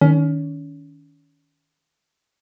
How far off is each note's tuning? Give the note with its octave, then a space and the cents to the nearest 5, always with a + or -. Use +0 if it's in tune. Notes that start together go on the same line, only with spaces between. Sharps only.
D#3 +0 C#4 +30